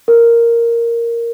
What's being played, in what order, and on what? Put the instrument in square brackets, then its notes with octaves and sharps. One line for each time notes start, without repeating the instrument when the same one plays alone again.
[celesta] A#4